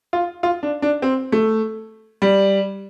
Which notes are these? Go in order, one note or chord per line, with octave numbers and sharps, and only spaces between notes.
F4
F4
D4
D4
C4
A3
G3